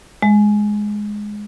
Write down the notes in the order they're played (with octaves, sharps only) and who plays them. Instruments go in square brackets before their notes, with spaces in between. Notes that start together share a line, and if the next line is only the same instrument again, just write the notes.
[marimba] G#3